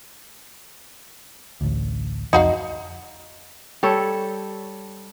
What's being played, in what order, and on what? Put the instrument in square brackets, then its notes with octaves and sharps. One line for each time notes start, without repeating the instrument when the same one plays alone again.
[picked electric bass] A1 D2
[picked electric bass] C2 F2 F3 [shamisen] D#4 F#4 F5
[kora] G3 A4 C#5